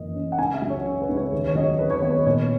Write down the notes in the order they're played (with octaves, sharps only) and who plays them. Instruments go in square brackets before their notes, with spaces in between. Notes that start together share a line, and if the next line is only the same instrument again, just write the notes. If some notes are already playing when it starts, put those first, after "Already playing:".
Already playing: [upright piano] F#2 E3 A#3 D#5
C#4
F#5
C#2 G#5
E5
F#3
C#5
C#3
B4
C#2
C#5
D#2 B4
C#5
F#3 D#5
C#5
D#3 B4
C#5
B4
B3 C#5
B4
A#2 C#5